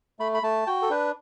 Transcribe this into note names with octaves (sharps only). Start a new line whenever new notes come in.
A3 B5
B5
A3 A5
F#4 G5
A4
D4 B4